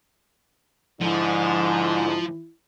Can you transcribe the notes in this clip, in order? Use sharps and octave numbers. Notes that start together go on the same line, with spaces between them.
G#2 D3 F3 E4